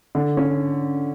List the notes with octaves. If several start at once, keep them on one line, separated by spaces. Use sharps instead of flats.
D3
C#4